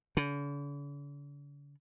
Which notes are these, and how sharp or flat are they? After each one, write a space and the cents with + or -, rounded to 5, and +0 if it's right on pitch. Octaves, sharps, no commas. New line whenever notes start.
D3 -45